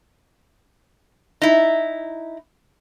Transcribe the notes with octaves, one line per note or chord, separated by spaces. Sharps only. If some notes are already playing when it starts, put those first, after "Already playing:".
D#4 E4